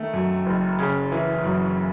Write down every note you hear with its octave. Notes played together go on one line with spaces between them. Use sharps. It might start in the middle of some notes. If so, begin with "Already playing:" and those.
Already playing: D#3 A3
F#2
F#1
C#3
E3
F#2